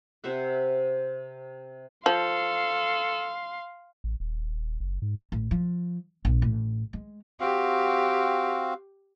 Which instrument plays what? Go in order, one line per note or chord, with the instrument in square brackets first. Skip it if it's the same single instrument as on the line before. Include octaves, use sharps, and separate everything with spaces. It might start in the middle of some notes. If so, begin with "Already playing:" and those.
[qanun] C3 C5 E5 F#5
[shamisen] F3 [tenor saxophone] A4 [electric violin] F5 C6
[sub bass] A1
D#1
F#1
G#2
[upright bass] A1
F3
A#1
A1
G#3
[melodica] C4 F#4 F5 [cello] G4